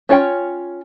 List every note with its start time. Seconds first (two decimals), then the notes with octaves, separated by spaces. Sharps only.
0.09 C#4 F4 C#5 G5